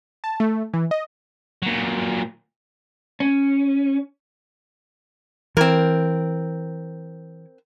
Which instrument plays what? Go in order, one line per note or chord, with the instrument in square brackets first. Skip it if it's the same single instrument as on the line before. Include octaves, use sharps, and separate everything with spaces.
[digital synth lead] A5
A3
E3
D#5
[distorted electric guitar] A#2 F#3
[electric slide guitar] C#4
[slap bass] E3 [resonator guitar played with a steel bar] C4 A#4